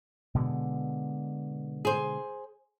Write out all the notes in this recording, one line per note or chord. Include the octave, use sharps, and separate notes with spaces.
B2 D3 G#3
G#4 C5